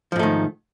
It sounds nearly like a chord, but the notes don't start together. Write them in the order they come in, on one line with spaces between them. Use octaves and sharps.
F3 G#2 A3 D#3